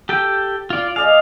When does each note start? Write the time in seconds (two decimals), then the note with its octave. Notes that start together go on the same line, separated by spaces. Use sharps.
0.09 G4 A4 G5
0.70 F4 D5
0.96 G#4 D5 D#5 F5